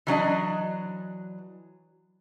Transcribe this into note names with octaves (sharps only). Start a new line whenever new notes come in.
E3 F#3 D4 D#5